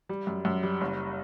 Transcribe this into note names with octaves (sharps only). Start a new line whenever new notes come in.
G3
F#2
F#2
G3
F#1